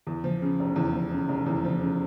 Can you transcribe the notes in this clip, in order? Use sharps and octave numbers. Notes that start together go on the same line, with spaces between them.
E2
F3
C#3
F1
E2
F3
C#3
F1
E2
F3
C#3